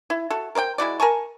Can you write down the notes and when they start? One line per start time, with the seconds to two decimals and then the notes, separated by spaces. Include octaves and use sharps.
0.10 E4
0.30 F#4 A4
0.55 A#4 C5 D5 G5
0.78 G#3 E4 F#4 D5
1.00 A#4 G#5 A5 C#6